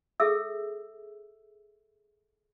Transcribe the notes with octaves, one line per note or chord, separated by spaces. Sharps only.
G#4 A4 E5 E6